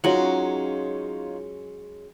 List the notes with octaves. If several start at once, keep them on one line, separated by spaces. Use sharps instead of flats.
F#3 G#3 C#4 D#4 F4 C#5 F#5